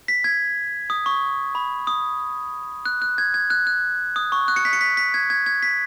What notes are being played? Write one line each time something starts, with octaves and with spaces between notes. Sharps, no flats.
B6
G#6
D#6
C#6
B5
D#6
F#6
F#6
G#6
G#6
F#6
F#6
D#6
C#6
F#6
C#7
B6
C#7
B6
B6
G#6
G#6
G#6
B6